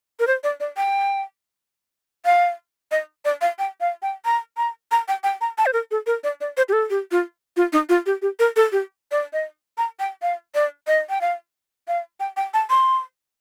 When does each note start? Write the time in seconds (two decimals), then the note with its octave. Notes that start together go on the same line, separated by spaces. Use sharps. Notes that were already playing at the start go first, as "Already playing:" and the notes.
0.20 A#4
0.27 C5
0.44 D5
0.60 D5
0.77 G5
2.25 F5
2.91 D#5
3.25 D5
3.41 F5
3.59 G5
3.81 F5
4.02 G5
4.25 A#5
4.57 A#5
4.92 A#5
5.08 G5
5.24 G5
5.41 A#5
5.58 A5
5.66 C5
5.73 A#4
5.91 A4
6.06 A#4
6.24 D5
6.41 D5
6.57 C5
6.69 G4
6.73 A4
6.90 G4
7.11 F4
7.57 F4
7.73 D#4
7.89 F4
8.06 G4
8.22 G4
8.39 A#4
8.56 A4
8.72 G4
9.12 D5
9.33 D#5
9.78 A#5
9.99 G5
10.22 F5
10.55 D5
10.87 D#5
11.10 G5
11.21 F5
11.88 F5
12.20 G5
12.37 G5
12.54 A5
12.70 C6